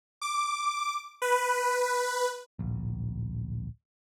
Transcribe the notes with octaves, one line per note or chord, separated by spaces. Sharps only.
D6
B4
D1 A#1